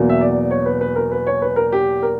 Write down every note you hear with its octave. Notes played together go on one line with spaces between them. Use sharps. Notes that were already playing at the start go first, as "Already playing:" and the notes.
Already playing: E2 B2 F#3 A#3
E5
D5
C#5
B4
B4
A#4
B4
C#5
B4
A#4
G4
A#4